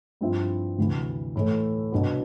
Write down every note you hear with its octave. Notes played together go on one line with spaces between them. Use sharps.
G2 F3 C4 E4
D2 C3 E3
A2 E3 A3
C2 B2 B3 D4